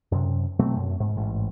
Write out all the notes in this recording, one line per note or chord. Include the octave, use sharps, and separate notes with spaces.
F#2 C3
B2 F#3 A3 C4
F#2
G#2
A1 G#2